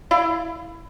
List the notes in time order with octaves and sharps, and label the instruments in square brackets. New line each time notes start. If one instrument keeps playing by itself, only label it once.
[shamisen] E4 D5 F5